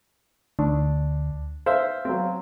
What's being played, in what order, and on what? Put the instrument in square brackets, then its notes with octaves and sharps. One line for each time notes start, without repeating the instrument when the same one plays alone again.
[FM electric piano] D2 [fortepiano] D4
[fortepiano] C5 E5 [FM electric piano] F5
[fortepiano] F#3 C4